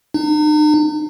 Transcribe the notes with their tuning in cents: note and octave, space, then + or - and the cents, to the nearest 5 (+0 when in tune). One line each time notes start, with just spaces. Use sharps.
D#4 -45